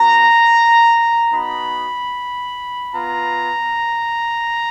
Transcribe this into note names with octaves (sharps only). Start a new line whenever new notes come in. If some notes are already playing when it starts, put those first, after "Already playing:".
Already playing: B3 F#4 A#5
B3 D#4 F#4 B5
B3 F4 A#5